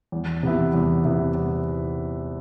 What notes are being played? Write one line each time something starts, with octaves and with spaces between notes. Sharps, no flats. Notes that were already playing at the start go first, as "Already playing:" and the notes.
E2
C3 E3 B3 E4
E2
C3 E3 B3 E4
E2